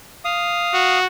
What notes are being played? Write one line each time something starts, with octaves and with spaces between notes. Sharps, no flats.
F5 D#6
F#4